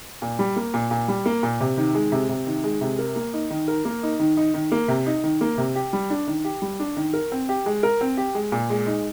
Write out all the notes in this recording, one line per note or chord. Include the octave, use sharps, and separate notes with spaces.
A#2
G3
A#3
A#2
A#2
G3
A#3
A#2
C3
D#3
G#3
C3
C3
D#3
G#3
C3
A#4
A#3
D#4
D#3
A#4
A#3
D#4
D#3
D#4
D#3
A#3
C3
D#4
D#3
A#3
C3
G4
G3
D4
D#3
G4
G3
D4
D#3
A#4
C4
G4
G#3
A#4
C4
G4
G#3
A#2
G#3
D#4